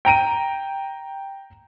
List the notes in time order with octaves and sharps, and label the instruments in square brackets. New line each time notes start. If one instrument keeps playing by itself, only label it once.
[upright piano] G5 A#5 D7 D#7